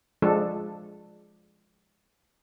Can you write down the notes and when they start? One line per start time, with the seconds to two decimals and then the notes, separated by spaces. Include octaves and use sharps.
0.22 F3 G#3 D4 A4